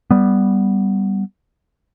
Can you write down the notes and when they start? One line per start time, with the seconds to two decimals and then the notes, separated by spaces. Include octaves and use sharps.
0.11 G3 B3